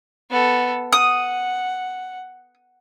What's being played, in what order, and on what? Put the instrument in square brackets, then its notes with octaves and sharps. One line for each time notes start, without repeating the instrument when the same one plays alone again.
[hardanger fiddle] B3 A4
[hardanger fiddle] F#5 [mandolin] D#6